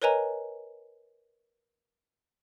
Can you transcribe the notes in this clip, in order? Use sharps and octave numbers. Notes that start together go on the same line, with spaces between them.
A#4 B4 C#5 D#5 G#5 A#5